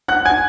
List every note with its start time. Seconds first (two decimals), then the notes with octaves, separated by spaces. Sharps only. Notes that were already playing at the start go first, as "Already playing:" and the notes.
0.08 F#5 F#6
0.25 G#5 G#6